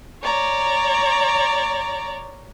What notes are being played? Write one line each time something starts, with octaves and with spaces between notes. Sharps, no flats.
C#5 D5 A#5